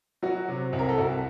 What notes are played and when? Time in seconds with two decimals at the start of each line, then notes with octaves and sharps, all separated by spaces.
0.23 F#3 F#4
0.48 C3
0.73 C2
0.79 A#4
0.89 A4
0.98 C2 F#4